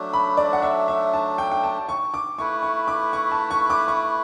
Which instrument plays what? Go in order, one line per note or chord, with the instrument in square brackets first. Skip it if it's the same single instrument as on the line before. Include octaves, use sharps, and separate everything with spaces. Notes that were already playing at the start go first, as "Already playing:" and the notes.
Already playing: [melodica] F#3 A3 D4
[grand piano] B5
D5
F#5
E5
E5
A5
G5
G5
A5
C#6
D6
[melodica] A3 E4 B4 [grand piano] C#6
[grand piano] C#6
D6
C#6
A5
C#6
D6
C#6